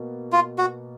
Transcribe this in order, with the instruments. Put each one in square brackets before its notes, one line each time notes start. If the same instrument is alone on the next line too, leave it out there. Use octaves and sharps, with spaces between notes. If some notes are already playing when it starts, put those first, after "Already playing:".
Already playing: [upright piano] B2 A#3
[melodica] F4
F#4